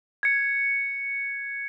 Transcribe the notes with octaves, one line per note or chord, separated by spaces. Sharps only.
G#6 C#7